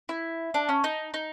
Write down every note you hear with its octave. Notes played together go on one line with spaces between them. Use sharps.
E4
D4
C#4
D#4
D#4